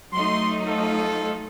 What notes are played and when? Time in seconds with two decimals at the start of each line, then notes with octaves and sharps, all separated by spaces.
0.13 F#3 A3 D#4 C6
0.66 F3 F4 A4